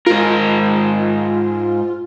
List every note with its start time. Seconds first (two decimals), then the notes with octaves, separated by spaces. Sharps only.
0.06 G#2 F4 A#4